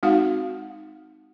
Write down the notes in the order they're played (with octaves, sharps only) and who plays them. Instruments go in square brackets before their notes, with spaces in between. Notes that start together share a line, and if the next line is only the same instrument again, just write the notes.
[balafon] G#3 C4 D#4 F#4 F5 F#5